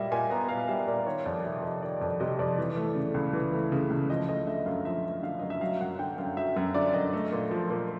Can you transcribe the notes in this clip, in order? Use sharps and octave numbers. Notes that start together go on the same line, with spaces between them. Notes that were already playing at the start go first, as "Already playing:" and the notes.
Already playing: A#2 G3 D#5 E5
A#2 G#5
B3 A#5
A#2 F5
G3 E5
A#2 D5
D#3 C#5
F2 D5
C3 E5
F2 D#5
D#3 D5
F2 D5
C3 D#5
F2 D5
E3
A3
C#3
C#2
E3
A3
C#3
C#2
F3 D#5
A3 D#5
D3 E5
F#2 F5
F3 E5
A3
D3 F5
F#2 D#5
E5
F#3 F5
F#2 F#5
D3 G5
F#2 F5
F#3 E5
F#2 E5
D3 D5
F#2 D#5
A3
A#2
F3
A#2